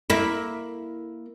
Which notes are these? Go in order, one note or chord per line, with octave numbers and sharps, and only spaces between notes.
A#3 E4